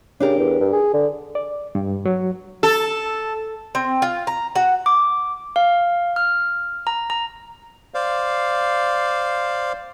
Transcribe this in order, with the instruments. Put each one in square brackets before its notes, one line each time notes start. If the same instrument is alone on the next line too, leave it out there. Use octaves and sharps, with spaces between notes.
[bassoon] C#3 [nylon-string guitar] D4 G4 A#4
[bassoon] E2
G2
G#4
D3
[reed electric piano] D5
G2
F#3
[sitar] A4
[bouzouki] C4
F4
A#5
F#4
[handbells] D6
F5
F6
A#5
A#5
[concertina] C5 D5 F5